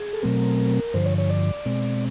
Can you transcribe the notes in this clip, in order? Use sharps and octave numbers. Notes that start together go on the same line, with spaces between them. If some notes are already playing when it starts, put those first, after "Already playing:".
Already playing: G#4
A4
B2 F#3 A3 C4 A#4
G2 D3 F3 C5
C#5
C#5
D5
B2 G#3 C4